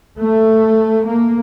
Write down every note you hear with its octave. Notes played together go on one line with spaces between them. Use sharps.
A3
A#3